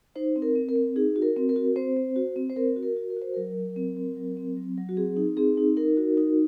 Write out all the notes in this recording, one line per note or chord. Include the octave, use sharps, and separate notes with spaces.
D#4 C5
C4
A#4
C4
A#4
C4
D#4 G#4
F#4
A#4
C4
A#4
F#4
C4 C5
C4
F#4
C4
C5
C4 A#4
F#4
A#4
F#4
A#4
F#4
C5
F#3 A#4
F#3
C4
C4
F#3
C4
F#3
F#3
F#4
C4 G#4
D#4
C4 G#4
D#4
D#4 A#4
F#4
D#4